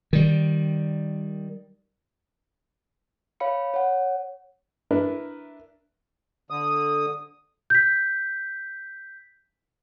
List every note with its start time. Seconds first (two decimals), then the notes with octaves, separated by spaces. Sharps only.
0.13 D#3 G3
3.40 C#5 F5 B5 C#7
3.74 C#5 F#5
4.91 D4 E4 A#4 B4
6.50 D3 D#6
7.70 G6 B6